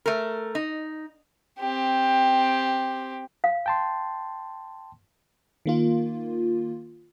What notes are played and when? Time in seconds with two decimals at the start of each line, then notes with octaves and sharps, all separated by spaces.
0.06 A3 A#4
0.55 D#4
1.59 C4 G4
3.44 F5
3.66 G5 A5 C6
5.66 D#3 A#3 F4